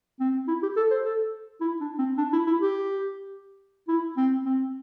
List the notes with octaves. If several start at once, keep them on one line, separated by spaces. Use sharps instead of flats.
C4
E4
G4
A4
C5
A4
E4
D4
C4
D4
E4
E4
G4
E4
C4
C4